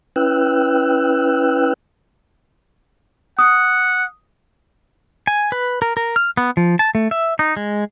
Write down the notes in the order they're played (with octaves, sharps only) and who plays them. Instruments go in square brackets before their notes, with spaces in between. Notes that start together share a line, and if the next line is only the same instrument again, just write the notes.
[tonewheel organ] C#4 E4 B4 G5 E6 F#6
[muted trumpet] F#5 [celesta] D#6
[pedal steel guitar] G#5
B4
A#4
A#4
F6
B3
F3
A5
A3
E5
D#4
G#3